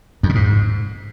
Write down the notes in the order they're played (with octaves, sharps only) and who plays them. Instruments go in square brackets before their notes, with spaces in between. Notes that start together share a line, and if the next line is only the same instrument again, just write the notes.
[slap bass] F2
A#2
G#2